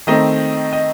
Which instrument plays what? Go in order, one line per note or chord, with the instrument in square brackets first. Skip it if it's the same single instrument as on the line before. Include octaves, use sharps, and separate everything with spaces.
[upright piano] D#3 A3 C4 [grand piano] D#5
[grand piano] D#5